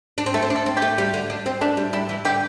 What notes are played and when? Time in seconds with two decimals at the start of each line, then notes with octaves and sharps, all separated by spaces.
0.18 D4
0.26 C4
0.34 A3 A4
0.42 C4
0.50 D4
0.56 A4
0.66 C4
0.77 G4
0.82 A3
0.98 G3
1.14 D3
1.30 D4
1.46 C4
1.61 A3 D4
1.77 G3
1.93 G3 E4
2.09 E3
2.25 D3 G4